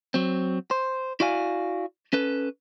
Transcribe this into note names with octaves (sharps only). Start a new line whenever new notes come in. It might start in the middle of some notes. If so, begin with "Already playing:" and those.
F#3 C4
C5
E4 F#4 D5 F5 G#5
C#4 A4 B4